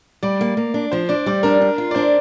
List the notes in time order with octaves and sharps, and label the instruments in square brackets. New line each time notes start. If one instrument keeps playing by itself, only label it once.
[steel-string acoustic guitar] G3 [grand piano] D5
[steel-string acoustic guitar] A#3
A#3
D4
[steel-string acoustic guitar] F3 [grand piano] C5
[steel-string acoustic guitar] D4 [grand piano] D5
[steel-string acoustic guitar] G3 [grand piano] D5
[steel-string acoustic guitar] D4 [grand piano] A#4
[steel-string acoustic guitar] D4
F4
[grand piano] D5
[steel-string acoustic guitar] D4 [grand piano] C5